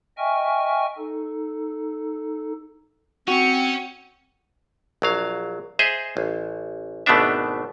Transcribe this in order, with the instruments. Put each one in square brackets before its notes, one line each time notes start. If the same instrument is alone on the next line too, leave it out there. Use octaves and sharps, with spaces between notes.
[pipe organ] D#5 E5 G5 G#5 C#6 F6
D#4 A4
[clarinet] C4 [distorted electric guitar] C#4 [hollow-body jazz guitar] F#4 [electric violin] G5 C#7
[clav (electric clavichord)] A#1 F#3 F5
G#4 C5 D#5 E5
A1
G#1 B2 A3 B3 D4 E5